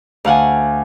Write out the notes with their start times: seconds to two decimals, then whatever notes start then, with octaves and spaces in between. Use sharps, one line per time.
0.25 D2 F5 F#5 G#5